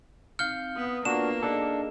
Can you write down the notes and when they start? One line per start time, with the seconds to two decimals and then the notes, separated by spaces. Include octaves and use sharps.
0.39 C4 D#4 F5 F6 G6 C#7
0.75 B3 D#6
1.05 A#3 B3 D4 F4 F#4 B4 E7
1.43 D4 D#4 G#4 A4 D#5